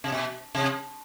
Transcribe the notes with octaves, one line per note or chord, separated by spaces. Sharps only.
C3
B2
C3